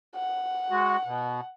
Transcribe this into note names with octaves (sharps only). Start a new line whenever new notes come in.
F#5
G#3 F#4
B2